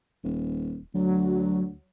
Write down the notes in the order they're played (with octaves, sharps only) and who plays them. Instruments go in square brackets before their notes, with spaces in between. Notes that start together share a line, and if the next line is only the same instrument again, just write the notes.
[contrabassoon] D#1
[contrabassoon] D2 [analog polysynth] F#3